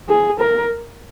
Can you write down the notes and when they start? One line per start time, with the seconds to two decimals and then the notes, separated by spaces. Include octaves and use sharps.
0.09 G#4
0.40 A#4